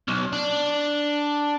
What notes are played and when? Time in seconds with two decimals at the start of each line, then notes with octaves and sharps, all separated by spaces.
0.08 B1
0.33 D4